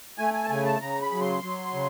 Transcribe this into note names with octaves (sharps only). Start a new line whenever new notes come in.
A3 G#5
G#5
A5
C#3 G#5
A5
C#3 A#5
B5
F#3
C6
F#3
C#3